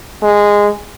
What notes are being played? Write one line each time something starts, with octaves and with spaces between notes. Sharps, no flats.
G#3